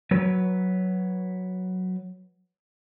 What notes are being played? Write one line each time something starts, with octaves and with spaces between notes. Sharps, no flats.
F#3 B4 C#5